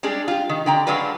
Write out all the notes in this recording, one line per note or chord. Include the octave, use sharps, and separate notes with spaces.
G3 G#3 D4 G#4
F4 G4
D#3
D3 G5 A#5
F#3 G#3 D4 F4 B4